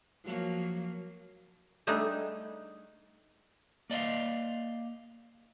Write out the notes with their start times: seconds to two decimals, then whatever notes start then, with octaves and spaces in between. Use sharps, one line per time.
0.23 F3 F#3 A#3
1.87 G3 A3 D4 D#4 G#4
3.90 A#3 D5 D#5 F5